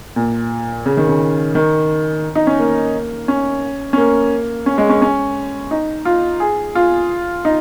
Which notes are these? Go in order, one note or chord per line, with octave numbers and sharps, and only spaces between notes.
A#2
C#3
D#3
C#3
D#3
D#4
C#4
A#3
C#4
C#4
A#3
C#4
G#3
C#4
C#4
D#4
F4
G#4
F4
D#4